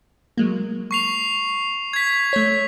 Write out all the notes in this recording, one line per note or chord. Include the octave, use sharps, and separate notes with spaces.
F#3 G#3 A#3
C#6 C7 F7
G#6 B6
A3 C#5